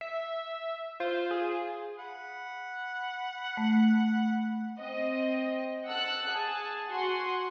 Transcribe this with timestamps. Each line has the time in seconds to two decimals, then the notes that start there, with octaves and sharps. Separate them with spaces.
0.01 E5
1.00 F4 C5
1.31 G#4
1.98 F#5 B5
3.57 A3
4.79 C4 D#5
5.87 F#5 A5 E6 F#6
6.28 G#4 A5
6.89 F#4 F#5 G#5 C6